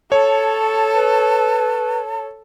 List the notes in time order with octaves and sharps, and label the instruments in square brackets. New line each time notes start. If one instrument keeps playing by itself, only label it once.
[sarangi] A4 [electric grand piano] C#5 [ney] A5
[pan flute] B4